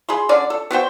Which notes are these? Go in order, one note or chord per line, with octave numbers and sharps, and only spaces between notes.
G#4 B5 C6
D3 C#4 D5
A4
B3 F#4 C5 G5